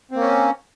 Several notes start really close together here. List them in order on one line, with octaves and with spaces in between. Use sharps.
C4 A#3 C#4